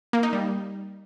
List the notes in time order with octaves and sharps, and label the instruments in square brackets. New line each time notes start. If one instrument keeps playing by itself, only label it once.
[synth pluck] A#3
D#4
G3